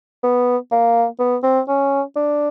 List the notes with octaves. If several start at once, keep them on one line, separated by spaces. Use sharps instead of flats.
B3
A#3
B3
C4
C#4
D4